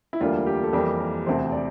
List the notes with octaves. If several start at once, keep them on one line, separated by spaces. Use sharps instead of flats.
E4
E1 D2 D3 G3 A#3 F4
G4
A4
F2 E3 G3 A#3 G4
A#4
E1 D2 C3 C5
D5